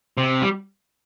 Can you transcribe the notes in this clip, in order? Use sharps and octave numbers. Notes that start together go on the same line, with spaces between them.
C3
G3